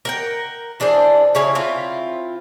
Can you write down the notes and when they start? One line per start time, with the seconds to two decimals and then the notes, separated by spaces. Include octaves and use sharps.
0.05 A#4 F#5 G5
0.80 E3 D4 G#4 C5
1.35 C#3 E4 C#5 G#5
1.55 C4 E4 F4